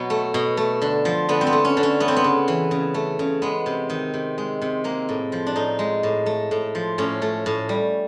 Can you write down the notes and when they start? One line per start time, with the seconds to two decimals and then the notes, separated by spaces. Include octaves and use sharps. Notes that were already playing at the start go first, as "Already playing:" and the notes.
Already playing: B2 F#3 B3
0.10 A3
0.34 B2
0.57 A3
0.82 D3
1.05 F3
1.29 D3 B3
1.41 C4
1.47 B3
1.53 A3
1.65 C#4
1.77 D3
1.83 C#4
2.00 A3 B3
2.08 C4
2.16 B3
2.24 C#3
2.48 E3
2.71 C#3
2.94 A3
3.19 C#3
3.42 G#3 B3
3.66 C3
3.90 D#3
4.14 C3
4.38 G#3
4.61 C3
4.84 G#3 A#3
5.09 A2
5.32 F3
5.47 D4
5.56 A2 D#4
5.79 G#3
6.03 A2
6.26 A3
6.51 A2
6.75 F3
6.98 A2 C#4
7.22 A3
7.46 A2
7.69 G3